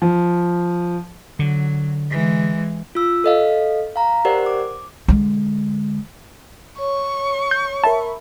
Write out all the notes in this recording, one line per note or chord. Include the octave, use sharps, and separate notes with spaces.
F3
D3 F#3
E3 G#3
F4 E6
A4 D#5 F5
F5 A#5
G4 A#4 C5 D5 F#5
D6
D3 G#3
C#5 C#6
G6
A#4 E5 A5 B5